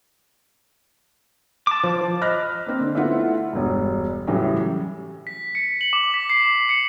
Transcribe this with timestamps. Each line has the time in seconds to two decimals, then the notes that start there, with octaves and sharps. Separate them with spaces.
1.67 A5 D6
1.84 F3
2.21 D#5 B5 F6 F#6 A#6
2.67 A#3 C4
2.80 D3
2.95 A3 B3 E4 F4 F#5
3.53 E1 G2
4.27 A2 C#3 E3 F#3 G3
5.27 B6
5.55 C#7
5.81 F#7
5.93 D6
6.14 B6
6.30 C7
6.69 C#7